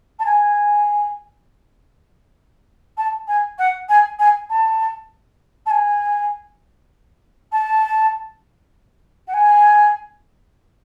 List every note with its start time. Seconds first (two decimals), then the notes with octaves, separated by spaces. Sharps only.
0.19 A5
0.25 G#5
2.97 A5
3.28 G#5
3.58 F#5
3.89 G#5
4.19 G#5
4.49 A5
5.66 A5
5.70 G#5
7.52 A5
9.27 F#5
9.33 G#5